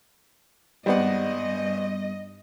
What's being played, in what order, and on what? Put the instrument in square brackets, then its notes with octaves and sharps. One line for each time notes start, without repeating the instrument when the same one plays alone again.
[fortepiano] G#1 D5 F#5 [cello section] G2 D#5 [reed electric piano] G3 B3